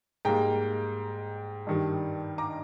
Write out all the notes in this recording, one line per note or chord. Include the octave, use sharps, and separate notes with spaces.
G#2 G3 A#3 G5 A#5
G2 D#3 G3
A#5 D6